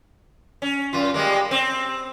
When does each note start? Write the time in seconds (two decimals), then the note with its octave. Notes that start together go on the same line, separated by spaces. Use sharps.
0.62 C#4
0.93 F#2 F4
1.14 G3 G#3 A#3
1.51 C4